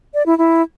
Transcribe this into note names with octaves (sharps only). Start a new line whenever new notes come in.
D5
E4
E4